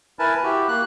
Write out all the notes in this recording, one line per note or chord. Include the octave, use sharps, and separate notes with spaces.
E4 A#4 B4 G#5 A5
E4 F#4 G4
A#3 F#6